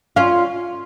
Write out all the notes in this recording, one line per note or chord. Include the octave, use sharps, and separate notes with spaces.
C#4 F4